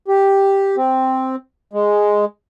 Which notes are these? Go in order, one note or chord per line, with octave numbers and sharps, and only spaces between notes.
G4
C4
G#3